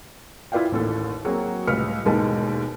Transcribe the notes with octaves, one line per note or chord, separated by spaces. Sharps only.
E4 F4 B4 D5 F5 G5
A1 D#2 A4
F#3 A#3 C4 F#4 G#4
C#2 A2 G3 B4 F6 C#7
E1 D#2 G#2 G#3 B4 A5